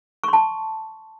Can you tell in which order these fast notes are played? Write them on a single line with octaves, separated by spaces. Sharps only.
C#6 C6 A5